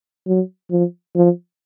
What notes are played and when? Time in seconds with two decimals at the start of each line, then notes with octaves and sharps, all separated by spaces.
0.27 F#3
0.71 F3
1.16 F3